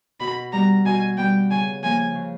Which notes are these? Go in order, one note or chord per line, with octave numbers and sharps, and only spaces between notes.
B2 B5
G3 B3 A#5
B2 G#5
G3 B3 G5
C#3 G#5
F3 A#3 G#5
C#3